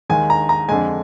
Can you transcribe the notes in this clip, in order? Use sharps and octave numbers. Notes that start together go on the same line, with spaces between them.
D#2 D#3 G#3 G#5
A#5
A#5
F2 D3 G#3 G#5